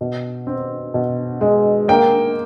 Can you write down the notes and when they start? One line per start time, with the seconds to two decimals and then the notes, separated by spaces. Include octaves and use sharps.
0.01 B2
0.47 C4
0.94 B2
1.41 G#3
1.88 A#3 G5